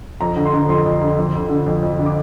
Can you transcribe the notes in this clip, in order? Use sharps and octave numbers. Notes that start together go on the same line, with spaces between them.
F2 A#5
D3
C6
D3
F2 C6
F2
D3
F2
D3
D3
F2
F2
D3
D6